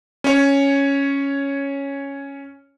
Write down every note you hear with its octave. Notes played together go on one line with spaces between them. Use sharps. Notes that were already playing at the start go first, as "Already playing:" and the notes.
C#4 C#5